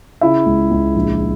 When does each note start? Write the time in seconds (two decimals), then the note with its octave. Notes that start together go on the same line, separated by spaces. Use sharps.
0.21 C#3 E4 E5
0.46 C#2
0.71 C#2
0.96 A#1